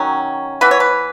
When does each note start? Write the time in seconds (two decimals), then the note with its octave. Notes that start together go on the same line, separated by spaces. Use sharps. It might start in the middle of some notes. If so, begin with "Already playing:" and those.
Already playing: D#3 F#3 C#4
0.61 E3 B3 B4
0.71 C#5
0.80 B4